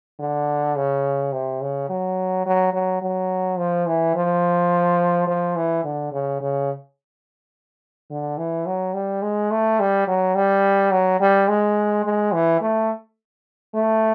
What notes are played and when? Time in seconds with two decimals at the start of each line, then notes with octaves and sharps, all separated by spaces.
0.20 D3
0.76 C#3
1.32 C3
1.61 C#3
1.89 F#3
2.46 F#3
2.73 F#3
3.02 F#3
3.58 F3
3.86 E3
4.15 F3
5.27 F3
5.56 E3
5.84 D3
6.12 C#3
6.41 C#3
8.10 D3
8.38 E3
8.66 F#3
8.94 G3
9.22 G#3
9.51 A3
9.80 G3
10.07 F#3
10.35 G3
10.91 F#3
11.20 G3
11.48 G#3
12.05 G#3
12.33 E3
12.61 A3
13.74 A3